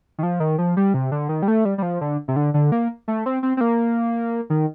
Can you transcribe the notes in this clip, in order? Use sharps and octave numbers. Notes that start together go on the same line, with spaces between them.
D#3
F3
D#3
F3
G3
C3
D3
D#3
G3
A3
G3
G3
F3
D3
C3
D3
D3
A#3
A3
C4
C4
C4
A#3
D#3